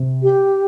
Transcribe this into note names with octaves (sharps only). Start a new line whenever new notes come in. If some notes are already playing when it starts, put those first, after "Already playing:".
Already playing: C3
G4